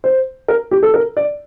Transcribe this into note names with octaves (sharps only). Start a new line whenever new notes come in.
C5
A#4
G4
A4
A#4
D5